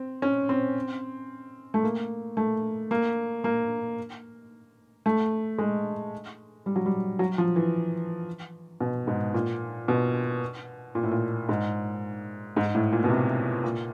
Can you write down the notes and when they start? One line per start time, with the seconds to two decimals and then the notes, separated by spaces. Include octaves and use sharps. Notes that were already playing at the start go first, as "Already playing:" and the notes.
Already playing: C4
0.22 C#4
0.49 C4
1.74 A3
1.83 A#3
2.37 A3
2.91 A#3
3.44 A#3
5.06 A3
5.58 G#3
6.66 G3
6.76 F#3
6.86 G3
7.19 F#3
7.38 F3
7.56 E3
8.81 B2
9.07 G#2
9.34 A#2
9.88 B2
10.95 A#2
11.03 A2
11.11 A#2
11.49 G#2
12.57 G#2
12.75 A2
12.92 A#2
13.04 B2
13.10 C3
13.64 A#2